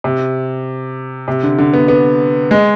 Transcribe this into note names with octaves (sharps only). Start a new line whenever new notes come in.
C3
C3
D3
D3
B3
B3
G#3